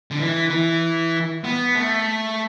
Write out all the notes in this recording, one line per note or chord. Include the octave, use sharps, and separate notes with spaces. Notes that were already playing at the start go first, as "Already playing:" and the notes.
D3
E3
E3
B3
A3